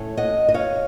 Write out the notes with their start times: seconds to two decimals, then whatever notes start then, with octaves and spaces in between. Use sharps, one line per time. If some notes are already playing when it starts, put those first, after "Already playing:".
Already playing: A2 A3 C#4
0.17 D#5 F#5
0.49 D#5
0.54 C#5 F5